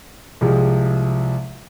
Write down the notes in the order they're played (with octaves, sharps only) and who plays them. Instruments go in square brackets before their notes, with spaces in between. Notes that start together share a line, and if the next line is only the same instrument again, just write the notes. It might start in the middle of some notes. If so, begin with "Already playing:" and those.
[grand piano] C2 C3 F3 G#3